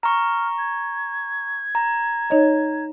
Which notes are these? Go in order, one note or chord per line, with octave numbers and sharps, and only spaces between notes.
A#5 C#6 F6
G#6
A#5
D#4 C#5 D#5